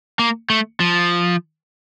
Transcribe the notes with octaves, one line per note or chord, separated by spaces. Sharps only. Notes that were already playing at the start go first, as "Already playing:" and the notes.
A#3
A3
F3